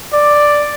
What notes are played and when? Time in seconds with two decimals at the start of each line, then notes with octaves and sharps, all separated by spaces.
0.13 D5